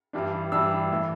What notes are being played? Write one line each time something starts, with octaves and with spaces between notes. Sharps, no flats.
G2 E3 G3 D4
G2 E3 G3 D4 E6
A2 E3